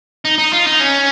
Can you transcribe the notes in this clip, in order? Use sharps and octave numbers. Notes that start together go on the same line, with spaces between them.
D#4
D#4
F4
D#4
C#4